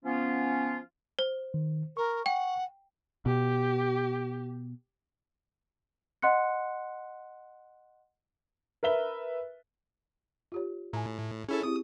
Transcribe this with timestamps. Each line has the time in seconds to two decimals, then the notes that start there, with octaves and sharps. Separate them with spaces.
0.05 F3 B3 C#4 F4
1.19 C5
1.54 D#3
1.97 A#4 C#6
2.26 F#5 G5
3.26 B2 G4
6.22 D#5 F#5 C6 F#6 C#7
8.83 A#4 B4 E5 G7
10.52 F4 G4 C#5
10.93 A2 G#5 A#5
11.49 C#4 E4 G#4 A4 C#5
11.63 C4 E4 G4 D#6